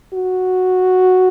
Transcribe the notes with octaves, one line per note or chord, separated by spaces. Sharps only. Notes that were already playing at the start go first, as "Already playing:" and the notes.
F#4